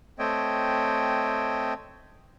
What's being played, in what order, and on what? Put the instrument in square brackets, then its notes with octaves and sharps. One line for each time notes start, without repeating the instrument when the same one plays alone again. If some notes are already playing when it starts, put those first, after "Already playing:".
[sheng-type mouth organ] A3 C4 C#5 D#5 E5 G5